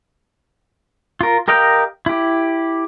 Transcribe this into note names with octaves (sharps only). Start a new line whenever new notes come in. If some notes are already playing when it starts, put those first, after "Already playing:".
F4 A#4
G4 A#4 D#5 F5 G5
E4 G4